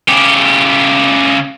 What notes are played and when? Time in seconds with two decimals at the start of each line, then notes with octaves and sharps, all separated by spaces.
0.08 C#3 G4